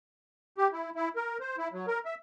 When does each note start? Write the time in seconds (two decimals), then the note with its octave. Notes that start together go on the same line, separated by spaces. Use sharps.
0.58 G4
0.73 E4
0.95 E4
1.16 A#4
1.40 C5
1.58 E4
1.73 F#3
1.88 A#4
2.05 E5